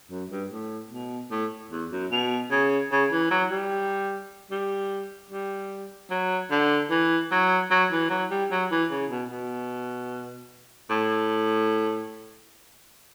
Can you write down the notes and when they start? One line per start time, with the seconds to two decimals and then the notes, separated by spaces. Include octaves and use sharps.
0.11 F#2
0.31 G2
0.52 A2
0.91 B2
1.31 A2
1.71 E2
1.92 F#2
2.11 B2
2.51 C#3
2.92 C#3
3.12 E3
3.31 F#3
3.51 G3
4.51 G3
5.31 G3
6.10 F#3
6.51 D3
6.91 E3
7.31 F#3
7.71 F#3
7.91 E3
8.10 F#3
8.31 G3
8.51 F#3
8.71 E3
8.91 C#3
9.11 B2
9.30 B2
10.90 A2